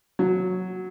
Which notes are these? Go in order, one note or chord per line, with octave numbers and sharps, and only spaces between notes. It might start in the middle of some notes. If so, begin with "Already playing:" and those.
F#3